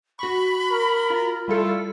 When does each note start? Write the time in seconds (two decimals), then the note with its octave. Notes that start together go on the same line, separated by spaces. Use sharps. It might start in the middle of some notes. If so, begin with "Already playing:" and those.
0.19 F#4 B5 C#6
0.71 A#4
1.10 F4
1.48 G3 A3 E4 F4 A4